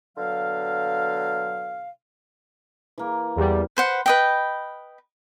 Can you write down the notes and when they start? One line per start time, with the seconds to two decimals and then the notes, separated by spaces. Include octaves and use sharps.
0.17 B2 D3 F#3 F5
2.98 E3 A#3
3.36 E2 G3
3.77 B4 C5 F#5
4.06 B4 D#5 G5